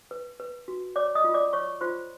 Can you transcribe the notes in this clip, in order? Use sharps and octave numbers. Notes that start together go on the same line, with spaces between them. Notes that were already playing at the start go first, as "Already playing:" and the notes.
B4
B4
F#4
C#5 D5 D6
D#5 D#6
F4
D5 D6
C#5 C#6
F4 C5 C6